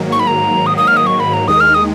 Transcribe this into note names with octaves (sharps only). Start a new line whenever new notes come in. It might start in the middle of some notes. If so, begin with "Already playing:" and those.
Already playing: G#2 D#3 F#3 A#3
C#6
B5
A#5
D#6
D#6
F6
D#6
C#6
B5
A#5
D#2 D#3 G#3 D#6
F6
D#6